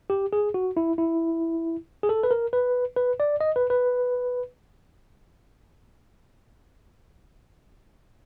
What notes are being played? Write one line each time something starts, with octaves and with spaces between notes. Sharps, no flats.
G4
G#4
F#4
E4
E4
G#4
A4
B4
A#4
B4
B4
D5
D#5
B4
B4